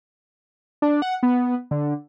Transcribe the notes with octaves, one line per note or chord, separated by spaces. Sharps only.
D4
F#5
B3
D3